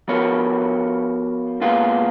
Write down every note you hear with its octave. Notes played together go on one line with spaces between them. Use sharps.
F3 B3 F#4 A#4 C#5
A#2 G#3 B3 F4